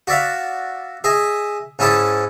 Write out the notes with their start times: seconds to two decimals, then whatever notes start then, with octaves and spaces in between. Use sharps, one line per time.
0.07 F#4 D5 E5 F5
1.04 G#4 D#5 E5 G#5
1.79 G#2 C#4 E4 G#4 A5 D6